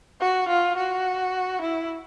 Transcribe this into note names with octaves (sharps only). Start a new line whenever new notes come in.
F#4
F4
F#4
E4